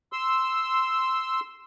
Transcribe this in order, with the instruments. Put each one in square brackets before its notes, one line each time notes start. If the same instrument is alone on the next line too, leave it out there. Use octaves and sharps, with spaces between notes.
[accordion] C6 E6